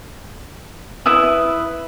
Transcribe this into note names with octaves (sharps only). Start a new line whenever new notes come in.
E4 B4 E5 D#6